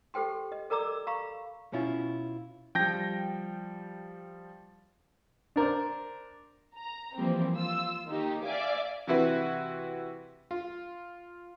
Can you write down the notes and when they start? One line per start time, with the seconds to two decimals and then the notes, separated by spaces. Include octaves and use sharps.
0.14 G4 A4 C5 G5 C6
0.52 D#5
0.70 A4 A#4 D5 A#5 D6 E6
1.07 F5 A#5 B5 C#6
1.73 B2 C#4 E4 F4
2.75 F3 G3 G5 G6 A#6
5.56 D4 A#4 C5 D5
6.76 A#5
7.16 E3 F3 G3 A#3 C4
7.55 F4 E6
8.07 D#3 A#3 D#4 G4
8.44 D5 E5 F5 G#5 D6
9.07 C3 E3 E4 F#4 B4 E5
10.51 F4